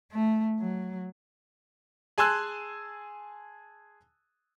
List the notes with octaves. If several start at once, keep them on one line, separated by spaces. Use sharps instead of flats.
A3
F#3
G#4 G#5 A5 C6 E6 F#6